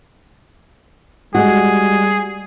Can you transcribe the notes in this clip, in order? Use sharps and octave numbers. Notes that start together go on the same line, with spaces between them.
G3 G#3 F#4 G#4